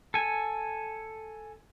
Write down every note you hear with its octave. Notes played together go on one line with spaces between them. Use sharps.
A4 G#5